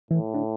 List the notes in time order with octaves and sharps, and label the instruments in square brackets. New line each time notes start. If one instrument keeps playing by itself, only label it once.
[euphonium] A2 [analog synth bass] E3
[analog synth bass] D3